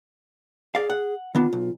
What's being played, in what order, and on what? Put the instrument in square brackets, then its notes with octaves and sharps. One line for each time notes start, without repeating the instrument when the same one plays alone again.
[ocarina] G#4 [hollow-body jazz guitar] D5 F5
[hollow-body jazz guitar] F#5
[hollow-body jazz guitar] D#3 B3 D4 [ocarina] F4
[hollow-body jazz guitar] B1